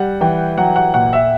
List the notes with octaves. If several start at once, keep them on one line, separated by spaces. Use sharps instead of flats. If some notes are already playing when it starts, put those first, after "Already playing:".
Already playing: G3 F#5
E3 G5
F#3 F#5
F#5
A#2 F#5
E5